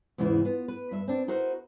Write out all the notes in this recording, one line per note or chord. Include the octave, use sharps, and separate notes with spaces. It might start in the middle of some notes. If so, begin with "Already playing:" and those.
E2 G#2 C#3 E3 E4
B3 F4
B4
G2 E5
C4 D4
D#4 E4 F#4 A#4 C5